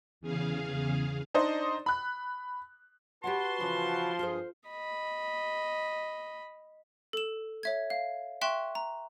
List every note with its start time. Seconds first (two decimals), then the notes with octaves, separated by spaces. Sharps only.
0.21 E2 C#3 G#4 F5
1.34 D4 D#4 C5 D5 D#5
1.86 B5 F#6
3.24 F#4 G4 B4 C#5 F#5 A5 C6
3.60 C#3 E3 F3 E4
4.19 G2 F4 G#4 A4 C5
4.69 D#5 B5
7.13 A4 E7
7.63 C#5 E5 G#6
7.90 F5
8.41 E5 G5 C6 C#6 F#6 E7
8.75 A#5